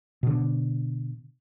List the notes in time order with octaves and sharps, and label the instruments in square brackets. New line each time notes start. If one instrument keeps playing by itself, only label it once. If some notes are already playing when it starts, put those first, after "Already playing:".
[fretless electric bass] B2 D3